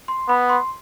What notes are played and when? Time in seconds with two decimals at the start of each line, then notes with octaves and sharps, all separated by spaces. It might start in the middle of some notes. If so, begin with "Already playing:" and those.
0.08 C6
0.28 B3 B5
0.49 C6